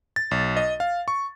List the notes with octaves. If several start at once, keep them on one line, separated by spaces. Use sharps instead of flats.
A6
B1
D#5
F5
C#6